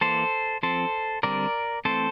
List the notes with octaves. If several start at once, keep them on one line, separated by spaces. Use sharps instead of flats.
E3 A#3 A4 C5
F3 C4 A4 C5
D3 G3 C4 A#4 D5
E3 A3 C4 A4 C5